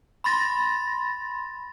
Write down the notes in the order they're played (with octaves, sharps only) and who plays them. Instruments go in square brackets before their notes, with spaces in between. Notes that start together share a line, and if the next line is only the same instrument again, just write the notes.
[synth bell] B5 C6 A6 A#6